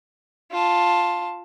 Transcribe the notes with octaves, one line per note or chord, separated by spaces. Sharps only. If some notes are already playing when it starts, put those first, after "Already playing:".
F4 A5